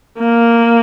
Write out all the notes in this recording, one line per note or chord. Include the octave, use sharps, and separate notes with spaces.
A#3